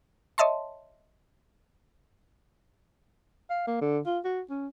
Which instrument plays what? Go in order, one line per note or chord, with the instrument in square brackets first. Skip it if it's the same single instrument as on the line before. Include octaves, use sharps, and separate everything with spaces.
[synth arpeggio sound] C#5 D#5 E5 A5 C6
[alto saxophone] F5
A#3
D3
F4
F#4
C#4